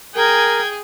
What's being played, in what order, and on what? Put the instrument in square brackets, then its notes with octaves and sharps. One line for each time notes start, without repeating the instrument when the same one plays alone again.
[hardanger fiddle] G#4 G#5 [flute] A#4 [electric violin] G5 G#6